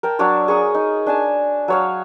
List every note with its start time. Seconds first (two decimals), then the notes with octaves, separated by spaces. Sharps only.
0.03 A#4 G5 A5
0.19 F#3 D4 C#5 D5
0.48 G#4 C#6 D#6
0.74 D#4
1.06 D4 G#5 A5
1.68 F#3 C#5 F5